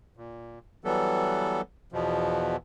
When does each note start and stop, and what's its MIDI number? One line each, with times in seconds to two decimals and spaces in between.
0.17 0.59 46
0.84 1.61 52
0.84 1.61 54
0.84 1.61 55
0.84 1.61 59
0.84 1.61 69
1.92 2.56 40
1.92 2.56 47
1.92 2.56 53